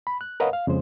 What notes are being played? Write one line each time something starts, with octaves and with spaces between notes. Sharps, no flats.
B5
F#6
A#4 B4 C#5 D#5 F5 F#5
F5
F2 C#3 G#3 C5